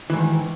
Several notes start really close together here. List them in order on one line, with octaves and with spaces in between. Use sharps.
E3 G#2 D#3